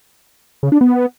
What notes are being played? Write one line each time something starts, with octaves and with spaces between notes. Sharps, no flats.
C#3
D4
B3